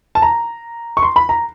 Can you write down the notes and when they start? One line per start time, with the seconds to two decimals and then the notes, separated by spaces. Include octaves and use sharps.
0.15 A5
0.22 A#5
0.97 C#6
1.03 C6
1.16 B5
1.29 A#5